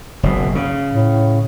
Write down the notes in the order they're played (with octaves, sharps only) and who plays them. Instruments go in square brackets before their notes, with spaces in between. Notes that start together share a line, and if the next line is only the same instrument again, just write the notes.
[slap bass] F#1 B2
C#3
[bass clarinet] A2